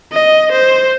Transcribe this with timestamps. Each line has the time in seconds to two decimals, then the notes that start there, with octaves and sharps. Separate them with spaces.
0.12 D#5
0.51 C5